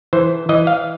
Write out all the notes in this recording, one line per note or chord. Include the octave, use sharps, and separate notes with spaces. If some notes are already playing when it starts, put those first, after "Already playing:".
E3 C5
E3 D#5
F5